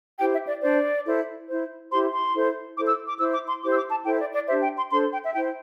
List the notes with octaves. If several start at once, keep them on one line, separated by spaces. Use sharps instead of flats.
E4 G4 C5 G5
E5
D5
D4 C5 D5
E4 A4 C5
E4 C5
E4 G4 C5 C6
C6
E4 A4 C5
E4 A4 C5 D6
E6
D6
E4 C5 E6
D6
C6
E4 G4 C5 D6
E6
D6
A5
E4 A4 C5 G5
D5
D5
D4 G4 C5 E5
G5
C6
D4 A4 C5 C6
G5
E5
E4 C5 G5